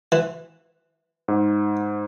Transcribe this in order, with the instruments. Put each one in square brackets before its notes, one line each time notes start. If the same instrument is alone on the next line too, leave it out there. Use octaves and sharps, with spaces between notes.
[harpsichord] E3
[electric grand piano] G#2